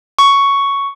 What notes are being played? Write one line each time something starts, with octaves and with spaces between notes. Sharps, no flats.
C#6